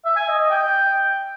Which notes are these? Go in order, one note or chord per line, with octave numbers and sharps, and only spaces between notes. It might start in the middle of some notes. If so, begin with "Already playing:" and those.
E5
G#5
D#5
D#5
G5